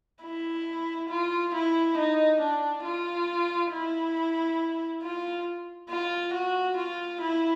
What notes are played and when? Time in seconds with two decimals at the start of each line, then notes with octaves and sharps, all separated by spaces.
0.23 E4
1.09 F4
1.54 E4
1.97 D#4
2.40 D4
2.85 F4
3.72 E4
5.02 F4
5.90 F4
6.33 F#4
6.77 F4
7.21 E4